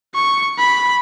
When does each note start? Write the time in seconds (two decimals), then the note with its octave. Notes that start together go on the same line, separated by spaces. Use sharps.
0.15 C#6
0.58 B5